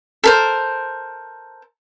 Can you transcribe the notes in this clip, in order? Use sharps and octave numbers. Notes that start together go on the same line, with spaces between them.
A4 A#4 C5